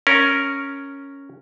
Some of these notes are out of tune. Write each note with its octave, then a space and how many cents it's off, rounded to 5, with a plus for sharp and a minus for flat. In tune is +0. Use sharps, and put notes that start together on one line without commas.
C#4 +0 A#4 +0